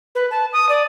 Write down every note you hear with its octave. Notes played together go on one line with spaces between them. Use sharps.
B4
A5
D#6
D5